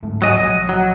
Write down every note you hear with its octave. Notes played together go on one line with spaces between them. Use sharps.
D1 G#2 A3
F#3 D#5 G#5
A#1
F#3